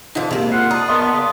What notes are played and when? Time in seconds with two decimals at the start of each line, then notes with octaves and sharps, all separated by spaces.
0.15 D3 E3 D#4 F4 C5
0.31 C3 G#3 A#3 E4
0.52 F4 A#4 F#5 C7
0.71 D4 A#5 D#6
0.89 B3 A#4 D#5 C6
1.12 C#3 D5 D#6